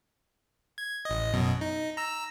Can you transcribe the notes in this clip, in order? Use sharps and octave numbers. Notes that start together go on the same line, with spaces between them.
G#6
A1 D#5
F#2 B2
D#4
A#5 E6